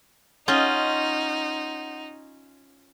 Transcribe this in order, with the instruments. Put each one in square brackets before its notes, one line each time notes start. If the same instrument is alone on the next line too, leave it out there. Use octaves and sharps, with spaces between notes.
[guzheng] C#4 F4 D#5 [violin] D#4 [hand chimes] F#5 C6 G6